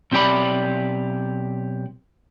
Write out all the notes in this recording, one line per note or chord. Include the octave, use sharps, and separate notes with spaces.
B1 C4 E4 G4 D5 B5